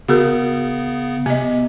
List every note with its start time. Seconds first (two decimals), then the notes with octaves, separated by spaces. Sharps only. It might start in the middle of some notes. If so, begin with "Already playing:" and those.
0.08 C#3 B3 F#4 G#4 A#4
1.26 C3 B3 D#5